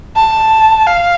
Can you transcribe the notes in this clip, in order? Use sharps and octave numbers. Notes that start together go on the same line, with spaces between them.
A5
F5